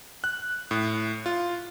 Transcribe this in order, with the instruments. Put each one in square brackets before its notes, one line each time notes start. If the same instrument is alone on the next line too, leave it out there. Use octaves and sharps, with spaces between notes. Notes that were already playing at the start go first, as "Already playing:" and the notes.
[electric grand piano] F#6
A2
F4